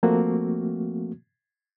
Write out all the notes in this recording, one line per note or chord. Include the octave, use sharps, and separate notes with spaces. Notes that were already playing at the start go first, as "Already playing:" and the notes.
F3 A3 A#3 C4 F#4